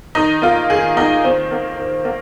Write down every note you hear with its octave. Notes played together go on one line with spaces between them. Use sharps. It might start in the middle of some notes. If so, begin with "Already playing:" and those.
D#3 D#4
A#3 F4
D#3 G#4
A#3 D#4
D#3 C4
A#3
D#3
A#3